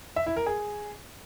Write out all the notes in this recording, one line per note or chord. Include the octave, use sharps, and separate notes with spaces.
E5
E4
A#4
G#4